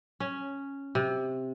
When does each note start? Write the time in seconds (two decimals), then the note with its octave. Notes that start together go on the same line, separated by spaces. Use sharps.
0.20 C#4
0.95 C3